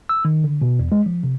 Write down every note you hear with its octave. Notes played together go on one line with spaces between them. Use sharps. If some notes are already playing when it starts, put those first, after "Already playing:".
E6
D#3
D3
B2
E2
G#3
F3
C3